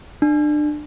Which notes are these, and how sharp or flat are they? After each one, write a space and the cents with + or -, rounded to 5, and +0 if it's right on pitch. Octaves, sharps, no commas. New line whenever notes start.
D4 +30